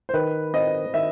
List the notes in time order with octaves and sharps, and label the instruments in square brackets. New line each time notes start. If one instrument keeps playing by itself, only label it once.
[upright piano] C5
[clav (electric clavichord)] D#3 [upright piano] B4
[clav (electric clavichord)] C4 [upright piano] D#5
[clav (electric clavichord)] D#3 [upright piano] E5